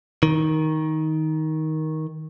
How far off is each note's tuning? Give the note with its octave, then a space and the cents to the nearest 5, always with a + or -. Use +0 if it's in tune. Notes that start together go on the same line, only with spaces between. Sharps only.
D#3 +10